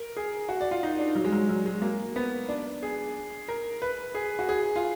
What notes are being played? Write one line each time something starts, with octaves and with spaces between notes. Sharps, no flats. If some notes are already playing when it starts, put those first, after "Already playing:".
Already playing: A#4
G#4
F#4
D5
F4
D#4
D4
F#3
G#3
F#3
F#3
G#3
A#3
B3
D4
G#4
A#4
B4
G#4
F#4
G#4
F4